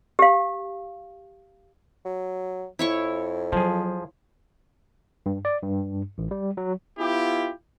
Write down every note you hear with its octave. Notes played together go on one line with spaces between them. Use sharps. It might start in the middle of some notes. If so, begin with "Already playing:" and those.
G4 F5
F#3
F2 E4 C#5 C#6
F3 F#3 G#4
G2
D5
G2
A1
G3
F#3
B3 E4 F4 G4